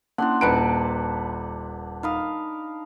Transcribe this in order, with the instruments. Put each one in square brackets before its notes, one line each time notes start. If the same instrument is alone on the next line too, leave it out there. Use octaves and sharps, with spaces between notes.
[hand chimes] A#3 C#4 E4 [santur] D4 F#5 C6
[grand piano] D#1 B4 D7 [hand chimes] A5 A#5 C#7
[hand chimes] D#4 B5 D#6 [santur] A#4 F5